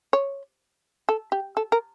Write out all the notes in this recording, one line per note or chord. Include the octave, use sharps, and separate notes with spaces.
C#5
A4
G4
A4
A#4